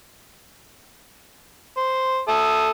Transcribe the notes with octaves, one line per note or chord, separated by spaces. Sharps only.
C5
A4 E5 D#6